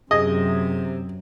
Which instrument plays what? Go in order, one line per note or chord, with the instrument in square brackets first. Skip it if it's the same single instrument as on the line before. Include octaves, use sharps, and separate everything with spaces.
[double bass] F#2 [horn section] C3 [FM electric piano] G#4 G#6 [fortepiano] D#5